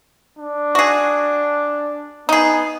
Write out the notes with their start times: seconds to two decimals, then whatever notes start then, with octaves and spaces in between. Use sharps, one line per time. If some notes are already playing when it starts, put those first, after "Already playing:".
0.39 D4
0.75 F#4 G#4
2.29 B3 D#4 G#4